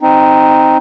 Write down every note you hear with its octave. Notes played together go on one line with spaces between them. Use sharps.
C4 D#4